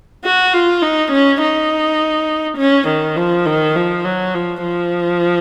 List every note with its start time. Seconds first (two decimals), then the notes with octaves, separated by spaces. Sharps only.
0.24 F#4
0.53 F4
0.82 D#4
1.12 C#4
1.41 D#4
2.58 C#4
2.88 D#3
3.17 F3
3.46 D#3
3.75 F3
4.05 F#3
4.34 F3
4.63 F3